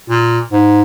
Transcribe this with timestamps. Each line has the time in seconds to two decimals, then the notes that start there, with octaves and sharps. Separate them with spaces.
0.10 A#2
0.52 G#2